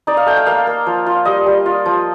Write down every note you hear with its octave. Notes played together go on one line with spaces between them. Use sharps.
D#4 D5
F5
A3 G5
G5
A#3 F5
A#3
F3
F4
G3 D#5
G3
F4
F3